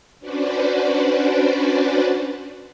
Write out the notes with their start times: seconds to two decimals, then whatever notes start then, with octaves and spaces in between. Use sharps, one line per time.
0.19 C#4 D4 F#4 B4 C5 D5